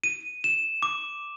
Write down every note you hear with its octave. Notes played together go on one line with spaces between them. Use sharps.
D#7
E7
D6